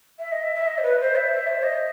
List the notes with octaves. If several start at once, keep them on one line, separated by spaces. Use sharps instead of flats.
E5
D#5
E5
E5
D#5
C5
B4
C5
E5
E5
C5
D#5